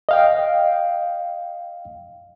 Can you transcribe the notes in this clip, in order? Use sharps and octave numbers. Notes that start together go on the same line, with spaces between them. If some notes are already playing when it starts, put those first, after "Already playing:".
D#5 F5 G5